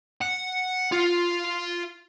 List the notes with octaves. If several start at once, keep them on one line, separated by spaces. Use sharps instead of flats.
F#5
F4